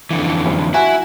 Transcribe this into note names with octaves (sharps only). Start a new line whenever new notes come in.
F2 D3 E3
F#1
E4 F#4 G#5 F#6